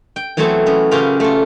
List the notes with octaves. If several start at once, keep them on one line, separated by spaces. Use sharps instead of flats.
G5
E3 F#3 A3 B3 C4 A5
B3 C#4
C#3 F#3 C#4 F4 G4 A#4
A3 F4